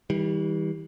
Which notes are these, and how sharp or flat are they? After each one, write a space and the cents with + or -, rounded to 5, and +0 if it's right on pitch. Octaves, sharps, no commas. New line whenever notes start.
E3 -35 G3 +10